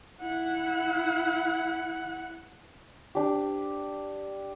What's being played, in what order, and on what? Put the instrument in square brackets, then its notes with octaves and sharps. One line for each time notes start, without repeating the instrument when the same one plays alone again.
[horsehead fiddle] E4 F#5
[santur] D4 G4